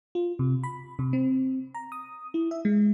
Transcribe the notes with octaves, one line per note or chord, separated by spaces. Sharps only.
F4
C3
B5
C3
C4
A#5
D#6
E4
E5
G#3